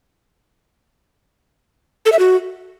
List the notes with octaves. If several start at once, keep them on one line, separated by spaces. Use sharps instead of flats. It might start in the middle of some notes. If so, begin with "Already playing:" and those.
A4
E5
F#4